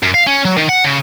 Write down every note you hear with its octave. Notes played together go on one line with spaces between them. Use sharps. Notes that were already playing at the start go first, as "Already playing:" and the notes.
F#2
F5
C#4
F#3
D#3
F#5
C#3